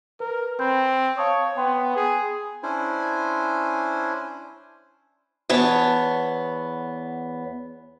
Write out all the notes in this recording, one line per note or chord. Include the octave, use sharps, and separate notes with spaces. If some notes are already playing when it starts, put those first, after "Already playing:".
A#4 B4
C4 B5 G6
C#5 F5 A5 D#6
B3 G5 C6
G#4
C#4 D4 E4 C5 G#5
E2 B3 C#5 A5